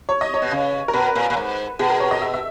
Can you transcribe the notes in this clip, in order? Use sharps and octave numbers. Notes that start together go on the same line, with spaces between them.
C#5
D#5
C#5
B2
C#3
A#4
B2 B4
A#2
A#2
G#2
B2 G#4
A#4
C#5
D#5
E5
E5